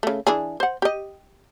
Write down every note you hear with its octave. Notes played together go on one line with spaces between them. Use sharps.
C#3 A3
E3 D4 G#4
C5 F#5
G4 D#5